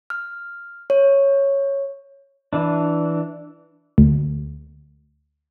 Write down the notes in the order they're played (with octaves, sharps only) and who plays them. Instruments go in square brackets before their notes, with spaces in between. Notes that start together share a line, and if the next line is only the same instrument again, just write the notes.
[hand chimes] F6
C#5
[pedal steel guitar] E3 D4
[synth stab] D2